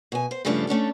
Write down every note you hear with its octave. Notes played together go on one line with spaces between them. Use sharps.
B2 G#5
C5
G2 C#3 F3 G3 A3 D4
A3 C#4 D4 A4